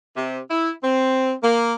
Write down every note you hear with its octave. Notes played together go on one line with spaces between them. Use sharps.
C3
E4
C4
A#3